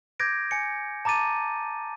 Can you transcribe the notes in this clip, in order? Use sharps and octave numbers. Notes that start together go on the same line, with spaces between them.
D6 G6 G#6 A#6 D7
G#5 C#7
A5 A#5 D6 A6 D#7